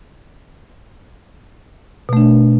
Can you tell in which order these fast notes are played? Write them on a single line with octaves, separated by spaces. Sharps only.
B2 A3 D4